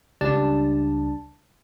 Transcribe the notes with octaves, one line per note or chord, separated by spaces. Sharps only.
C#2 G3 D4 A5